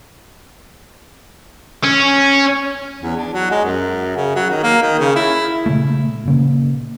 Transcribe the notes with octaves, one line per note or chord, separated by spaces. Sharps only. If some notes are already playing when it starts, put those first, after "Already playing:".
C#4
E2
D4
F#3
G#3
F#2
C#3
F#3
D#3
A#3
D#3
C#3
E4
A#2 C#3 G#3 A3
A#2 C#3 A#3